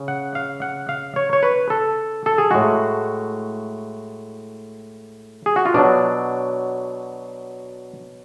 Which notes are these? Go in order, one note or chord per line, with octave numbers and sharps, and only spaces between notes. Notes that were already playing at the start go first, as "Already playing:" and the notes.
Already playing: C#3
F#5
F5
F#5
F5
C#5
C#5
B4
A4
A4
G#4
A2 G#3 F#4
G#4
F#4
F4
B2 F#3 D4